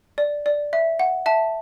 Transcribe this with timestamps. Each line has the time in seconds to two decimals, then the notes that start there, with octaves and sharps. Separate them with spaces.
0.18 D5
0.46 D5
0.73 E5
0.99 F#5
1.26 E5 A5